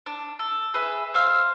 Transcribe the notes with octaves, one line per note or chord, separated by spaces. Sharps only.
D4
A4
G#4 B4 E5
C5 F5 E6 F6